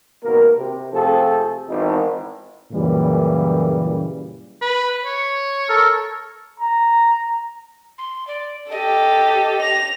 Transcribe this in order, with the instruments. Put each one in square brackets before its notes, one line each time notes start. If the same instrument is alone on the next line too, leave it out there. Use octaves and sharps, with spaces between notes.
[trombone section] G#1 B2 A#3 F#4 A#4
C3
C3 F3 A3 C4 G#4 A4
G#1 E2 D#4
F#2 A#2 C#3 E3 G3
[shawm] B4
C#5
[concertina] A4 A#4
[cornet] A#5
[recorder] C6
D5
[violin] G4 A4 [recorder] D#5
[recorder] A#6 [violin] F7